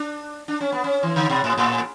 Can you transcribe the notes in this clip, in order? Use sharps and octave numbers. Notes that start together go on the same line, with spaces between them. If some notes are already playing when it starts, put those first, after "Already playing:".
Already playing: D4
D4
C#4
B3
C#4
E3
D3
B2
A2
A2